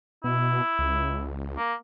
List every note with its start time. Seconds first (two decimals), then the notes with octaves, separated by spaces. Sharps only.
0.24 B2 E4
0.79 C#2
1.57 A#3